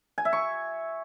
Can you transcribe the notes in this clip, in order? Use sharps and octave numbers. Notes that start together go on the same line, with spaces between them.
G#5
E5
C#6